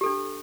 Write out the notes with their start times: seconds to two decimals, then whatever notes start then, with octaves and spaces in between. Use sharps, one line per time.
0.01 G4
0.04 A4
0.06 D4